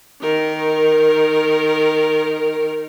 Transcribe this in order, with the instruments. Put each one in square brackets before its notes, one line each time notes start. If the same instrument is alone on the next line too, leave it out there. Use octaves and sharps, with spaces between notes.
[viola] D#3 A#4